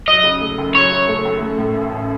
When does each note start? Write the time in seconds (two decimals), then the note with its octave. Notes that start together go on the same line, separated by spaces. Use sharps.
0.08 F#3 D#5
0.24 C#3
0.41 A3
0.58 F#2
0.74 F#3 C#5
0.92 C#3
1.08 A3
1.25 F#2
1.41 A3
1.58 A2
1.76 A1
1.92 A1